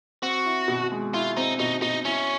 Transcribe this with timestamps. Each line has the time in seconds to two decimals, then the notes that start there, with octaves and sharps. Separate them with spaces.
0.22 C4 F#4
0.45 E4
0.68 B2
0.92 G#3
1.14 E4 F4
1.37 C4 D#4
1.59 B2 D#4
1.82 B2 D#4
2.05 C#4 E4